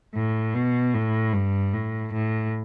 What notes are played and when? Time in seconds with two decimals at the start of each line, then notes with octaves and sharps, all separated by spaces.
0.15 A2
0.55 B2
0.94 A2
1.33 G2
1.73 A2
2.13 A2